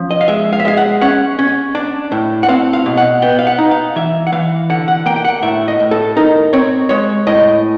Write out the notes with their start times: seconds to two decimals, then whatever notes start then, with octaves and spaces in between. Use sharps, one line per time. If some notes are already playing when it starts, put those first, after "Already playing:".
Already playing: F3 C#4
0.11 D#5
0.21 F5
0.28 G#3 E5
0.53 F5
0.60 E5
0.65 G#3 F5
0.77 F#5
1.01 C#4 F#5
1.39 C#4
1.75 D4
2.12 A2
2.43 F#5
2.49 C4 F5
2.73 F5
2.86 B2
2.97 F#5
3.22 B3 G5
3.39 F5
3.47 F#5
3.59 D#4
3.71 F5
3.96 E3 E5
4.27 F#5
4.32 E3 F5
4.70 D3 F#5
4.88 F#5
5.06 A#3 G5
5.16 G5
5.25 F#5
5.42 A2 E5
5.68 D#5
5.80 A2
5.91 A4
6.17 D#4 A#4
6.53 C4 C#5
6.89 G#3 C#5
7.27 A2 D#5